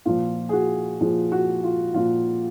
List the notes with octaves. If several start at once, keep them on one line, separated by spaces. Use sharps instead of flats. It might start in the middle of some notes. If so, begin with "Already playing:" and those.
A#2 F3 F4
G#4
F#4
A#2 F3 G#4
F#4
F4
A#2 F3 F4